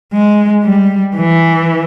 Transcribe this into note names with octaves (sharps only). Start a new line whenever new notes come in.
G#3
G3
E3